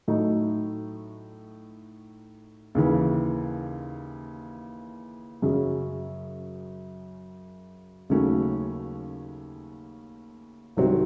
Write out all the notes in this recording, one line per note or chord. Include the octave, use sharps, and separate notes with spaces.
A2 F#3 A3 D#4
D#2 C#3 E3
F#2 C#3 F#3 C#4 G#4
D#2 C#3 F#3 A3 C#4
C2 C3 D#3 F#3 C4